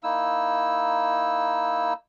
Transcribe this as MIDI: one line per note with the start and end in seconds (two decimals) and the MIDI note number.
0.03 1.93 58
0.03 1.93 63
0.03 1.93 64
0.03 1.93 88